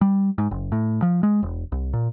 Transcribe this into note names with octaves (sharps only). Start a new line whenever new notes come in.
G3
G#2
F#1
A2
F3
G#3
E1
C2
A#2